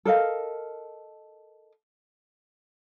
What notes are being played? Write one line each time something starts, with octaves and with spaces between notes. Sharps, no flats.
A4 A#4 D#5 F5